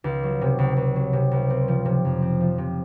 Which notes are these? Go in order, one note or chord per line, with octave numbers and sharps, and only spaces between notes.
C#2
F#3
C3
C#2
C#2
F#3
C3
C#2
C4
F3
C3
F2
C4
F3
C3